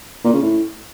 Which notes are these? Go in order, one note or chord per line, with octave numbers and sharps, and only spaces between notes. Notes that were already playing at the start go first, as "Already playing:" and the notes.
A#2
C#3
A2